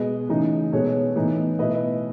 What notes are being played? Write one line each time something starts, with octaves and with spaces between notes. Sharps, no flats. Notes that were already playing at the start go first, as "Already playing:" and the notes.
Already playing: B2 G#3 B3 B4 D#5
C#3 E3 A3 D#4
B2 G#3 B3 A4 C#5
A2 E3 B3 D#4
B2 A3 E4 B4 D#5